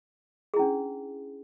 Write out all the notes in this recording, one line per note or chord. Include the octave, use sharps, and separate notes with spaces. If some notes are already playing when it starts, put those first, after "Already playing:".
C#4 D4 E4 G#4